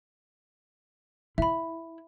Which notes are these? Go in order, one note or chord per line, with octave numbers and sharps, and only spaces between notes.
E4 E5 B5